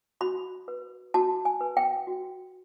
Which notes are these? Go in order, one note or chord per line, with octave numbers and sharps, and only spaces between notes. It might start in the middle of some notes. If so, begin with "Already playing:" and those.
F#4 B5
B4
F#4 A5
G#5
B4
G5
F#4